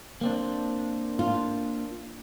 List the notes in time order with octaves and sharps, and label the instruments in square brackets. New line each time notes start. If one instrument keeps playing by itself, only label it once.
[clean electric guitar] A#3 C4 D4
[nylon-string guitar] F4